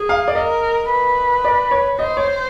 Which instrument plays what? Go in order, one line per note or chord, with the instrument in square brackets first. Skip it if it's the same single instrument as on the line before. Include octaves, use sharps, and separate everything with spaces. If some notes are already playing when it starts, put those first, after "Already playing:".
Already playing: [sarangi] G#4
[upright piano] F5
D5
[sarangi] A#4 [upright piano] D#5
[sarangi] B4
[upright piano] D5
C#5
[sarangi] C5 [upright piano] D#5
[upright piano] C#5